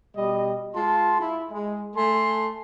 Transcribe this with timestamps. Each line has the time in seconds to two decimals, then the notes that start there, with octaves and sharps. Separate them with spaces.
0.16 B2 G3 D#5
0.75 G#3 F4 A5 C6
1.20 E4
1.50 G#3
1.96 A3 A4 G#5 A5 C6